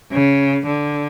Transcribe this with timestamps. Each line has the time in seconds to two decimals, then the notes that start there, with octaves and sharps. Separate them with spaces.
0.12 C#3
0.66 D3